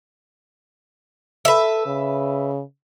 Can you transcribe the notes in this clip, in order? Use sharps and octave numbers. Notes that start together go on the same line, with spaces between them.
A4 B4 E5
C#3